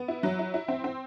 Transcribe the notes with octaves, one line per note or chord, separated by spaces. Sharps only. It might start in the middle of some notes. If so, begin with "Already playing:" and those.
Already playing: B3
E4
F#3
E4
E4
C4
C4